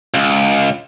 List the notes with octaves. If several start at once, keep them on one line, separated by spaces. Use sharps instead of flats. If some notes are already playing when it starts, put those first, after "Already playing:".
C#2